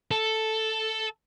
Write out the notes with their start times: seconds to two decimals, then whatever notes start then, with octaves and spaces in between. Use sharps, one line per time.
0.11 A4